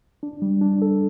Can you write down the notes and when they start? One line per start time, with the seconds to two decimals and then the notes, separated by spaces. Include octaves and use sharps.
0.23 D4
0.42 G3
0.61 D4
0.82 A4